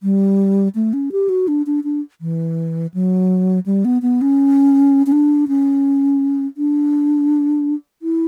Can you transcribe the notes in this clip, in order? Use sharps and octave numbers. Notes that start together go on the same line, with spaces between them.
G3
A3
C#4
G4
F#4
D4
D4
D4
E3
F#3
G3
B3
B3
C#4
C#4
D4
C#4
D4
E4